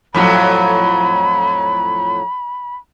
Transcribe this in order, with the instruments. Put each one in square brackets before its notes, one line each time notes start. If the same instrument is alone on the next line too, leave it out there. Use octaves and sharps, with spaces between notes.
[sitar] F2 A2 F#3 [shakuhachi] B5